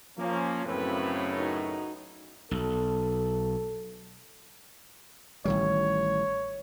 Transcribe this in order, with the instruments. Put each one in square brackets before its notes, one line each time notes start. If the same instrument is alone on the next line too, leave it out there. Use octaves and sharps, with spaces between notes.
[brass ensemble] F3 A#3 C#4
[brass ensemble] F#2 A2 C#3 [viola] C4 B4
[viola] D#4 F#4
[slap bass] B1 [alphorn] A4
[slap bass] A1 D#3 G3 [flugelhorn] C#5